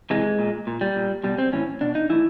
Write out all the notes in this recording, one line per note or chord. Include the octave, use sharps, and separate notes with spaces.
C3 E3 G#3
A#2
A#2
G3
A#2
B2 G3
C4
A2 E3 C#4
B2 D4
D#4
A2 E3 E4